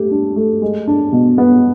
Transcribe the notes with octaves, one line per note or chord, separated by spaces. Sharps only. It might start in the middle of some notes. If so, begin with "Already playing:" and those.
Already playing: A3 G4
D4
A3
G#3
D4
B2
B3